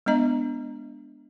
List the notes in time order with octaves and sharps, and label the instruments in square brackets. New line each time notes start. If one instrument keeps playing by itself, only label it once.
[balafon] G#3 B3 D4 D#5 A#5